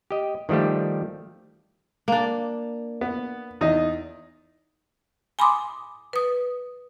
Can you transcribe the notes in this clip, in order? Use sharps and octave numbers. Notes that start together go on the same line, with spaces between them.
G4 D#5
D#3 F3 G3 A3 G4
A#3 D4
B3
E2 D#4 D#5
G#5 B5 C6 D6 D#6
B4 D#6